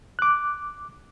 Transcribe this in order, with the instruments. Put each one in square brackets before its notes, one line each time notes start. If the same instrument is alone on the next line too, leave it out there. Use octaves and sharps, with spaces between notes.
[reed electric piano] D6 F#6